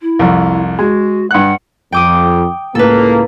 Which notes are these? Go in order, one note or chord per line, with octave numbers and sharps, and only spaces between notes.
E4
C2 F2
G#3 F#4
G2 F#5 F#6
F2 G5 D6 D#6
C#2 A2 A#3 A4 B4